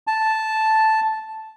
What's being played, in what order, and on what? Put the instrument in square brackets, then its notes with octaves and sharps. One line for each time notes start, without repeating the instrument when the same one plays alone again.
[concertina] A5